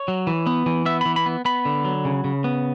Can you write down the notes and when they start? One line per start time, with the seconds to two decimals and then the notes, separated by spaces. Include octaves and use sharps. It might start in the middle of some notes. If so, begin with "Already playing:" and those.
Already playing: C#5
0.08 F#3
0.27 E3
0.46 B3
0.66 E3
0.86 B3 E5
1.01 E3 B5
1.16 B5
1.26 B3
1.45 B3 B5
1.65 D3
1.85 F#3
2.05 C#3
2.24 C#3
2.44 B3